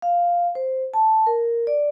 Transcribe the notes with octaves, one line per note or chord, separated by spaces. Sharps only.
F5
C5
A5
A#4
D5